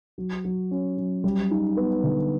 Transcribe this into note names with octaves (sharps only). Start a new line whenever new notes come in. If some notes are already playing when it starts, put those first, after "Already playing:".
F#3
F#3
C#4
F#3
G3
D#4
B3
D3